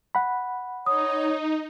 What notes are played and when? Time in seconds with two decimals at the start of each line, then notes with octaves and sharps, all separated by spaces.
0.15 F#5 B5
0.86 D#4 C#5 D#6